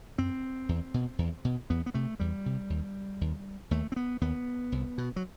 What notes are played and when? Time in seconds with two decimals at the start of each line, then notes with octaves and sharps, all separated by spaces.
0.18 F#2 C4
0.69 E2
0.94 B2
1.19 E2
1.45 B2
1.70 E2 B3
1.86 B3
1.94 C3 A3
2.20 E2 G3
2.46 C3
2.70 D#2
3.21 D#2
3.71 D#2 A3
3.92 C4
3.96 B3
4.21 D#2 B3
4.72 C2
4.98 B2
5.16 F#3